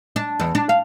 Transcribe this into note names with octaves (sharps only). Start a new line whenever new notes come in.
D4
E2
D4
F5